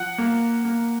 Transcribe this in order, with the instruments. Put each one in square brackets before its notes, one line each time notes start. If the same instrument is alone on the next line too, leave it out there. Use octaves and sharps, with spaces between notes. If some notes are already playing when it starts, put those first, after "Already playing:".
Already playing: [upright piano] F3 F#5
A#3
A#3